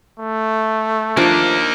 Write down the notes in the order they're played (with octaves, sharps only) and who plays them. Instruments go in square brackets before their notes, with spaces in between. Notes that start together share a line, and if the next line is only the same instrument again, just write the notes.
[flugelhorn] A3
[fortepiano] F3 [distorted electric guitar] A#3 D#4 [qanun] D4 A5